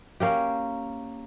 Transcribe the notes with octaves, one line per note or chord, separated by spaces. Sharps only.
A#3 C#4 G4